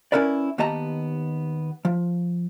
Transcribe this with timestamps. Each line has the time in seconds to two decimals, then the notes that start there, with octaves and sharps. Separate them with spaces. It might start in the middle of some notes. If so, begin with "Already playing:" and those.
0.12 C#4 E4 A#4 B4 D5
0.58 D#2 B3 G4 D#5 A5 A#5
1.85 F3